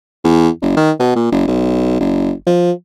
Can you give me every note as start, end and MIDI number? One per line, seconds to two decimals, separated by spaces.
0.24 0.49 40
0.62 0.73 30
0.77 0.92 51
1.00 1.14 47
1.16 1.29 46
1.31 1.44 30
1.47 1.97 35
2.00 2.32 30
2.47 2.72 53